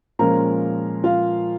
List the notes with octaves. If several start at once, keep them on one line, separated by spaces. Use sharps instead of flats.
A#2 F3 G#3 C#4 A#4 A#5
F4 F5